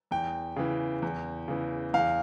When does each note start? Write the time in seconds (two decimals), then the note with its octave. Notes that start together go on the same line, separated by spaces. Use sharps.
0.11 E2 G5
0.57 C#3 E3
1.02 E2
1.48 C#3 E3
1.94 E2 F5